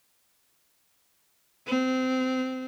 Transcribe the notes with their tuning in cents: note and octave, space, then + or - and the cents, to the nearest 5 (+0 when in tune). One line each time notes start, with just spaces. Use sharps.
C4 -20